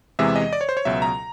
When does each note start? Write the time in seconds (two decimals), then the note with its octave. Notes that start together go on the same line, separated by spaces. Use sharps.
0.19 E2 C3 E3 G#3 E5
0.36 D#5
0.53 D5
0.61 C#5
0.69 C5
0.77 C#5
0.85 C#2 B2 F#3 E5
1.02 A#5